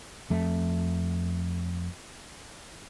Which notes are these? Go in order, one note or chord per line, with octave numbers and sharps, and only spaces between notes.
F2 A3